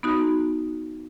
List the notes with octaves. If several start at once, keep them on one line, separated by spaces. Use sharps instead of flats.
B3 D#4 F#4